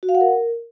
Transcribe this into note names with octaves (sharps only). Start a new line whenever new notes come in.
F#4
F5
F#5
A#4